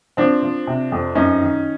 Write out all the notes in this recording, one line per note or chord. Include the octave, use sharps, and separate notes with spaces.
F3 C4 D4
F3
C3
F2
F#2 C#4 D#4
D#3